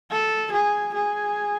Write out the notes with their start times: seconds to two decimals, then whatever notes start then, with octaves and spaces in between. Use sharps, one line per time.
0.10 A4
0.52 G#4
0.94 G#4